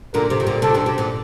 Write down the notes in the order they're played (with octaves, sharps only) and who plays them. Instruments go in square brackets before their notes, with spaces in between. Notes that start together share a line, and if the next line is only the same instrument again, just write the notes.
[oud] A#2 D3 [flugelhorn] A#4
[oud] C3
D#3
A#2 D3
[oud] C3 D#3 [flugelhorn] A4
[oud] A#2 D3
C3
A#2 D3